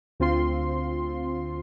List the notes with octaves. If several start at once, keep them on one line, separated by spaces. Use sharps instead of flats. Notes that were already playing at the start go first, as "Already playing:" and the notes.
D2 C4 F4 C6